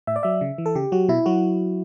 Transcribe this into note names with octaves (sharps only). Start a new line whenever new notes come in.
A2 E5
D5
F#3 E5
C#3
E3
A4
C#3 G4
F#3 F#4
B2 E4
F#3 F#4